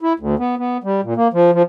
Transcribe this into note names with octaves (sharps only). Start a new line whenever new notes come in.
E4
D2
B3
B3
G3
A#2
A#3
F3
F3